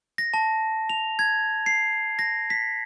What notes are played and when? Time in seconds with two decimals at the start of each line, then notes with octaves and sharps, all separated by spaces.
0.18 A#6
0.34 A5
0.89 F7
1.19 G#6
1.66 C7
2.19 A#6
2.50 B6